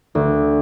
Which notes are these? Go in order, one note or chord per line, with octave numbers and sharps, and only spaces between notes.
D2